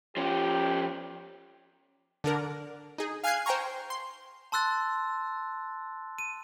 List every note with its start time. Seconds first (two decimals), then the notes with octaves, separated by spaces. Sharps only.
0.17 F3 C#4 G4
2.24 D3 D4 A#4
2.98 D#4 G#4
3.24 F5 G#5 F6 F#6 G#6 C7
3.46 C5 G5 G#5 A#5 C#6
3.90 C6
4.52 A5 C6 E6 F#6 A6
6.18 D#7